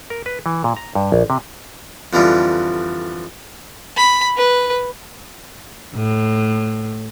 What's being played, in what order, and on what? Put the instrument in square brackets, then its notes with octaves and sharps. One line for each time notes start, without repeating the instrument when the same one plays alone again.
[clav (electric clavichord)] A#4
B4
E3
A#2
A#5
G2
A#1
C3
[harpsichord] F2 D3 E3 F3 G3
[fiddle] B5
B4
[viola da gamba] A2